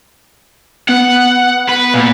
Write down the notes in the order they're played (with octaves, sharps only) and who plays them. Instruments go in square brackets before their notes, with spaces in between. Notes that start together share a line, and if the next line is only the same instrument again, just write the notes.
[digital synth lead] B3 [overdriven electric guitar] F#5
[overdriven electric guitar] B4
A#2